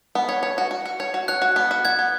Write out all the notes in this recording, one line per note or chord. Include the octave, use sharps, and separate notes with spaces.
B3
C#5
C#5
F#4
F#4
F#4
C#5
F#4
C#5 F#6
F#4
B3
F#4
F#4 G#6
B3